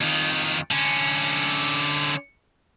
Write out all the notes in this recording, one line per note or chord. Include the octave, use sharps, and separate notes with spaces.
F2 D#3
D3 C#4